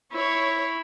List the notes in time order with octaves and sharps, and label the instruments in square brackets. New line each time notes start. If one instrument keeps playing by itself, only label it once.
[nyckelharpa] E4 [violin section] C#5